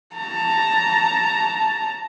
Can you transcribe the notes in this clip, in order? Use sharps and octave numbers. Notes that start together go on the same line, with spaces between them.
A5 A#5